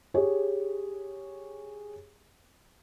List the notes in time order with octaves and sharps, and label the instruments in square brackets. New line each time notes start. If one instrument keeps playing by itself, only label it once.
[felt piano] G4 G#4 C#5